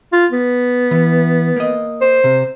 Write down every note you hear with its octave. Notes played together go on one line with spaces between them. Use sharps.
F4
B3
E3
A#3 D#5
C5
C3